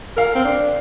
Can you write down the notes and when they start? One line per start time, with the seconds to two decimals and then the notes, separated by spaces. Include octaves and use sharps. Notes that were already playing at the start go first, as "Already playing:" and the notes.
0.17 A#4 F5
0.35 C4
0.45 D4